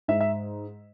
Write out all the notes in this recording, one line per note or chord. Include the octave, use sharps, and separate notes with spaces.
G#2 E5
E5